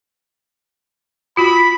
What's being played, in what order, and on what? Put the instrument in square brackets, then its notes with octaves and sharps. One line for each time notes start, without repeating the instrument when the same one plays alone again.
[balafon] F4 F#4 [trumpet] B5